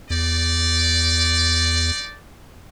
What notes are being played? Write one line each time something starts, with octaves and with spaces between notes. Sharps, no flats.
E2 D#4 D5